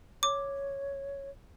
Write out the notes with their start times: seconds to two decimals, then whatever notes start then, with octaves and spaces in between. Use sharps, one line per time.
0.23 C#5 D6